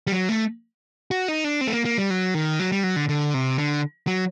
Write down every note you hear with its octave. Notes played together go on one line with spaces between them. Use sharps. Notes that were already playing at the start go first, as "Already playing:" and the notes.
G3
F#3
A3
F#4
D#4
D4
C4
A3
A#3
A#3
G3
F#3
D#3
F#3
G3
F#3
D3
D3
C3
D3
F#3